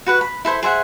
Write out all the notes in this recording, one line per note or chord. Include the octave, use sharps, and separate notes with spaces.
F#4 B4 F#5
B5
E4 A4 C5 E5
G#4 C5 E5 F#5